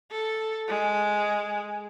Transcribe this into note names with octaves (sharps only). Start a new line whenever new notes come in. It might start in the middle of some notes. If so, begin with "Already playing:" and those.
A4
G#3